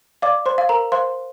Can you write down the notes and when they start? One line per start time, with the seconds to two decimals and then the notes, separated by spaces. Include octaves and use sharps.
0.22 D5 F5 D6
0.46 C5 C6
0.58 F5
0.69 A#4 A#5
0.92 C5 F5 C6